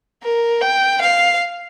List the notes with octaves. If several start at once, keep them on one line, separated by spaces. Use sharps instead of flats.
A#4
G5
F5